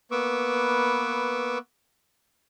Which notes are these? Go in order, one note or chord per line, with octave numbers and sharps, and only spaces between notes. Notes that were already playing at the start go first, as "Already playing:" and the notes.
A#3 B3 B4 C#6 D6 E6